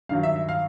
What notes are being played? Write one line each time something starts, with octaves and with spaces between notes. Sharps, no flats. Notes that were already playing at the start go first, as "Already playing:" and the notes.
G2 D#3 F#3 F5
E5
E5
F5